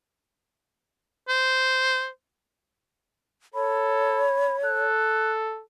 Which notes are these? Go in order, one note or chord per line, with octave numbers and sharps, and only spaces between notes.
C5
A4 C#5 B5
A4 F#6